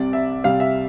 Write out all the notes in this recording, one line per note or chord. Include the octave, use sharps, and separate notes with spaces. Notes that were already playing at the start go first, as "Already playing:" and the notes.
Already playing: C2 C3 G3 D5
E5
C2 C3 G3 F5
E5